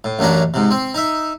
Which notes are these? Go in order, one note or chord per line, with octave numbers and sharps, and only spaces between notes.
A2
A1 F#2 C#4 D4 A#5
G#2 C3
C4
D#4 E5